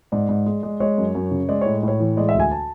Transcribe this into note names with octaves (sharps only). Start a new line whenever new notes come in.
G#2 D5
G#2
G#3
G#3
G#3 C#5
F#2
F#2
C#3
G#3 D5
A2 C#5
A2 C#5
E3
G#3 D5
E5
D2
G#5
A5